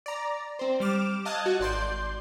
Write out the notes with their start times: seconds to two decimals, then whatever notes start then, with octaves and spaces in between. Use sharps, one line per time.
0.06 D5 A#5
0.59 C4 C5
0.80 G3 D6 F6 E7
1.25 D#5 F5 A5 D#6 F#6 G#6
1.46 F#4
1.59 G#1 D5 C6 G6